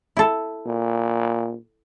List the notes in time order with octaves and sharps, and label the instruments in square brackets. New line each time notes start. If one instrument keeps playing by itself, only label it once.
[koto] E4 A4
[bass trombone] A#2